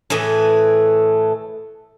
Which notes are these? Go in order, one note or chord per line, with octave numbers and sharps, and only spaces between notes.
A2 E3 A3 G#4